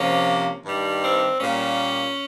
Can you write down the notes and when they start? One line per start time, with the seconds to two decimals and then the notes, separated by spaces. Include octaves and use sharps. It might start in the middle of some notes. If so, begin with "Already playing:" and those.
Already playing: C3 F3 A#3 C#4
0.64 G2 D#3 G3
1.02 C4
1.40 A#2 G3 A#3 C#4